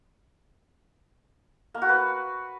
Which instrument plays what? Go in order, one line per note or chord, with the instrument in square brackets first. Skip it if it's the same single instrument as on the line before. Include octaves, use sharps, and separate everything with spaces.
[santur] A#3
F#4
B4